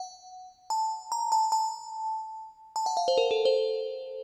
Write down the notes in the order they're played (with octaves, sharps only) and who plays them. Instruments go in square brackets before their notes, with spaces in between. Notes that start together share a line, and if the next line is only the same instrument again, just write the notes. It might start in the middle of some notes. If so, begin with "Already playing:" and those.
Already playing: [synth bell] F#5
A5
A#5
A5
A5
A5
F#5
F5
C5
A#4
A4
C5